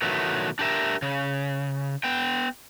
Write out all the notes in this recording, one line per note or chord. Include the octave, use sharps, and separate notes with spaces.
B2 D#3 E3 F#3 A3
D4 G4 A#4 E5
C#3
B3 G5